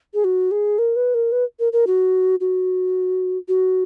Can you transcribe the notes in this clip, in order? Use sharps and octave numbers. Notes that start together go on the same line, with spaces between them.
G#4
F#4
G#4
A#4
B4
A#4
B4
A#4
A#4
F#4
F#4
F#4